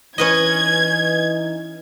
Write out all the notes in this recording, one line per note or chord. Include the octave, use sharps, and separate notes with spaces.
E3 C#4 D#4 B4 D#5 G#6